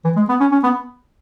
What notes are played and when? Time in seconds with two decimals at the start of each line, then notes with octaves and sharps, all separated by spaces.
0.05 E3
0.16 G#3
0.29 B3
0.40 C#4
0.52 C#4
0.63 B3